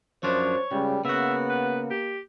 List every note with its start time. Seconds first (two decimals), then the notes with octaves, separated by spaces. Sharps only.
0.23 F#2 F3 D4 C5 C#5
0.72 C#2 C#3 G3
1.05 C#3 A#3 B3 F#4 E5
1.50 B4
1.90 G4